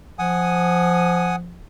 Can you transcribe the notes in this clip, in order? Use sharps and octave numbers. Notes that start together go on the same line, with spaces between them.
F3 F#5 G#5 D#6